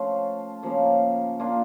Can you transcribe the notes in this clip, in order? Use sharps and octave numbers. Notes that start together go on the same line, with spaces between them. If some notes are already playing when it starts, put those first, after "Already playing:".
Already playing: F3 A3 C#4 F4
C#3 F3 A#3
A#3 D4 F4